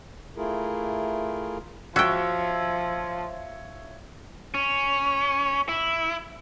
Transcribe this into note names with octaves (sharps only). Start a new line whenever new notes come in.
A3 E4 F4 G#4 A#4
F3 F#4 C#5 E5 G5
C#4
E4